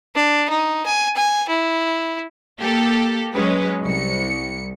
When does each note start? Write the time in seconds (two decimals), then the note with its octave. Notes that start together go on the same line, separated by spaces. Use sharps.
0.15 D4
0.49 D#4
0.86 G#5
1.16 G#5
1.48 E4
2.59 A#3 G4 A4
3.35 F#3 G#3 C#4 B4
3.85 C2 C#7